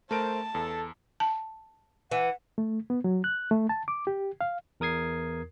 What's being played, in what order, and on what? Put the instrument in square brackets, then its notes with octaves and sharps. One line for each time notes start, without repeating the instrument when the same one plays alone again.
[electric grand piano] A3 A#4 D7 [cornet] C5 [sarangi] A5
[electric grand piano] E2 [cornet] A4
[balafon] A5
[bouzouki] E3 [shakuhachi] F#5
[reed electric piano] A3
B3
F#3
F#6
A3
A5
D6
G4
F5
[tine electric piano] E2 A#4 D#6 G#6 C7